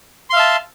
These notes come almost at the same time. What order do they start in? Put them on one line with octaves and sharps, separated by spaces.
C6 F5 E5 A5